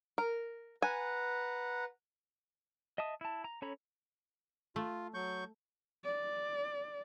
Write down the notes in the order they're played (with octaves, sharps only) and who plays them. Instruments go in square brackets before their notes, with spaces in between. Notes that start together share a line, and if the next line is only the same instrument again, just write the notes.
[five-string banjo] A#4
[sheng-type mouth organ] B4 F#5 A#5 [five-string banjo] G#5
[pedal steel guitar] D#5 E5 A5 D#6
E4 A5
A#5
C#4 A4 C#5 A#5 B5
[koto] A3 [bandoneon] F4
[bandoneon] F#3 C#6 G6
[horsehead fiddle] D5